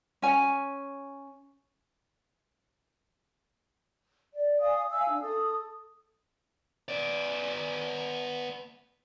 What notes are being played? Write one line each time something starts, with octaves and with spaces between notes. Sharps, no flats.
C#4 G#5
D5
D5 F5 G#5 D#6
E5 F5 G#5 E6
D4
A4 D#6
B3 D5